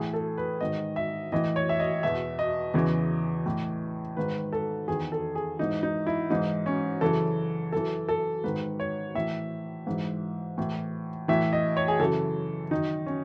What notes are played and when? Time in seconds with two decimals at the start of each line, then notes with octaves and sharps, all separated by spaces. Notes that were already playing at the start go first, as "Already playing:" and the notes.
Already playing: A2 E3 G#4
0.14 A4
0.38 B4
0.61 G#2 D#3 D#5
0.96 E5
1.32 A2 E3 D#5
1.56 C#5
1.69 E5
1.80 D#5
2.03 E2 B2 E5
2.39 D#5
2.74 E2 C#3 E3
3.46 A2 E3
4.17 G#2 D#3 B4
4.53 A4
4.88 E2 D#3 G#4
5.12 A4
5.35 G#4
5.59 G#2 E3 D#4
5.83 D#4
6.06 E4
6.30 G#2 E3 D#4
6.66 C#4
7.01 F#2 C#3 E3 A4
7.72 F#2 E3 A4
8.08 A4
8.44 G#2 D#3 B4
8.80 C#5
9.15 A2 E3 E5
9.87 G#2 E3
10.58 A2 E3
11.28 A2 E3 E5
11.53 D#5
11.77 C#5
11.88 G#4
12.00 F#2 C#3 E3 A4
12.71 F#2 D#3 D#4
13.06 C#4